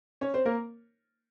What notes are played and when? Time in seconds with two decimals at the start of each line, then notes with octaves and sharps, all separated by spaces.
0.21 C#4 C#5
0.34 C4 C5
0.45 A#3 A#4